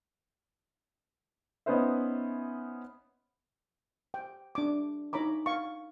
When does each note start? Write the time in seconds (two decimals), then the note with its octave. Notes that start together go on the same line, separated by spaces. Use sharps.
1.66 B3 C#4 D#4 B4 C5 E5
4.14 G5
4.55 D4 D6
5.13 D#4 C#5 A#5 B5 D6
5.46 F5 C#6